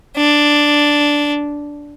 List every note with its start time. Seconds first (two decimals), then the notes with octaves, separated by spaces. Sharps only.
0.17 D4